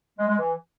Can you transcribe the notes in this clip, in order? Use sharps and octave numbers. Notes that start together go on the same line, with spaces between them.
G#3
G#3
E3